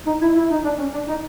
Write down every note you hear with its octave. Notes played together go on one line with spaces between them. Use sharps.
D#4
E4
E4
D#4
D4
C#4
D4
D#4